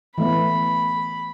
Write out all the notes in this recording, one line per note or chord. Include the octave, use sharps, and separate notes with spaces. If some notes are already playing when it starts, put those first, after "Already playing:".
E3 A3 B3 B5